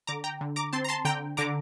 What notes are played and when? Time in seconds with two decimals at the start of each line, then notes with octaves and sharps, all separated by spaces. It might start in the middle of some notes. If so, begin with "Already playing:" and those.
0.07 D3 A#5 D6
0.24 G5 A#5
0.41 D3
0.56 A#5 D6
0.73 C4 A5 C6
0.84 A#5
0.89 A5 C6
1.05 D3 G5 A#5
1.37 D3 A#5 D6